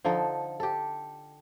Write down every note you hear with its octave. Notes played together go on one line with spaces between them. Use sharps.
D3 F3 D#4 A4
G4 A4